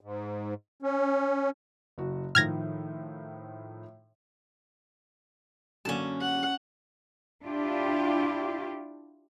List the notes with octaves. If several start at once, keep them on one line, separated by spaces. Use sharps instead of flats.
G#2
C#4
F#1 F#4
A2 D#3 F3 F6 G#6 A#6
F#2 D3 A#3 C#4 A5
F#5
D4 E4 F4 G4